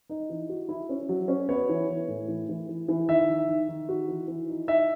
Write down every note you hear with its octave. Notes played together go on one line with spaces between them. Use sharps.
D#4
E3
F#4
E4
C#4
F#3
C#4
B3 C#5
E3
E3
A2
E3
E3
E3
E3
D#3 E5
D#3
D#3
D#3
F#4
E3
E3
D#4
D#4 E5